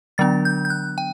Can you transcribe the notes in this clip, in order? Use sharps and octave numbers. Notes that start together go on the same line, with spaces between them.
D3 F#3 B3 D4 A6
G6
G6
F#6
G5